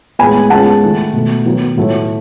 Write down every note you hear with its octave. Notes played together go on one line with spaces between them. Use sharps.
A2 G#3 B3 G#5 B5
C#3 G#3 B3 F#5 A5
D#3 A3
B2 A3
D#3 F#3 B3
A2 F#3 A3